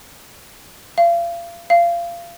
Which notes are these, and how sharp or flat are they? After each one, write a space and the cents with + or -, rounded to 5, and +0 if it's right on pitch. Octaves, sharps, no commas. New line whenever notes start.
F5 -35
F5 -25